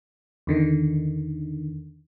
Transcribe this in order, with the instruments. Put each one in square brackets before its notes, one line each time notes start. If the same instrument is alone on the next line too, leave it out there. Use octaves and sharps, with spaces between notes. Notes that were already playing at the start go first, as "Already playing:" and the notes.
[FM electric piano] E2 D3 D#3